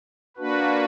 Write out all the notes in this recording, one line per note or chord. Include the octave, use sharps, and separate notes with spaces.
A#3 D4 F#4 B4